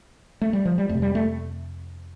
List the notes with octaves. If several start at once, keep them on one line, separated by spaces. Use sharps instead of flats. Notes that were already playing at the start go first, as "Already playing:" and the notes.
A3
G3
F3
G3
F2 C3 A3
G3
A3